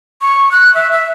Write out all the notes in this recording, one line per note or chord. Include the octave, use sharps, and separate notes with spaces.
C#6
F#6
E5
E5